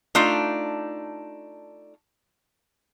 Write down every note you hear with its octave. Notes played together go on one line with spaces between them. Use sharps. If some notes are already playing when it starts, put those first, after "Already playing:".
A3 D4 D#4 F4